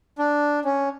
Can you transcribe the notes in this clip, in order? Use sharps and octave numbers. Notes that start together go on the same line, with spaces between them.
D4
C#4